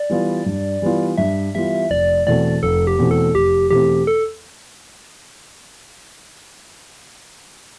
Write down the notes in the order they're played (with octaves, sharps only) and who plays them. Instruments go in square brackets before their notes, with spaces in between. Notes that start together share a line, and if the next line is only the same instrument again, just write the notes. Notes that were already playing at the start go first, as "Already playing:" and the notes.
Already playing: [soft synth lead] D5
[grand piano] E3 G3 B3 F4
G2
E3 G3 B3 F4
[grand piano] G2 [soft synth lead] E5
[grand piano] E3 G3 B3 F4 [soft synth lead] E5
[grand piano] F1 [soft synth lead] D5
[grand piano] E2 B2 A3 C4 [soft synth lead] D5
[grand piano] F1 [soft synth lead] A4
[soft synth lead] G4
[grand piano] E2 B2 A3 C4
[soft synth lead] A4
[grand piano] F1 [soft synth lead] G4
[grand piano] E2 B2 A3 C4 [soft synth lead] G4
[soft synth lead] A4